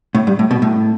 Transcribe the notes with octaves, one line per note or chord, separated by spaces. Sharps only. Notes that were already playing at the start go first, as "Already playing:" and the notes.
A2
G2
A2
B2
A2